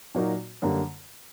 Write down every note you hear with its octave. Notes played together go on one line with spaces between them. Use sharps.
A#2 F#3 A#3 D#4 F#4
F#2 D3 G3 A#3